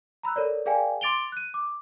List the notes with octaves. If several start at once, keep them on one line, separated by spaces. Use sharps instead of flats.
A#5 B5 E6 F#6
A4 A#4 C#5 D5
G#4 A#4 D5 F5 G5 G#5
C6 D6 A6 D7 F7 G7
F#6 D#7
D6